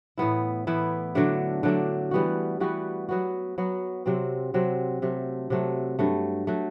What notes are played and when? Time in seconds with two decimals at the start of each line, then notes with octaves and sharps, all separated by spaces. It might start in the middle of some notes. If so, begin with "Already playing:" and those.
0.18 A2 E3 B3 E4
0.67 A2 E3 B3 E4
1.15 D3 F#3 A3 D4
1.63 D3 F#3 A3 D4
2.11 E3 G3 B3 F#4
2.60 E3 G3 B3 F#4
3.09 F#3 B3 F#4
3.58 F#3 B3 F#4
4.06 C3 F#3 C4
4.54 C3 F#3 C4
5.02 C3 F#3 A3
5.50 C3 F#3 A3
5.99 G2 F#3 A3
6.47 F#3 A3